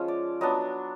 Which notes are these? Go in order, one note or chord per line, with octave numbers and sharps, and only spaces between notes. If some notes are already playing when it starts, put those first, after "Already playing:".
Already playing: F3 G#3 C#4
D5
F#3 B3 D4 D#5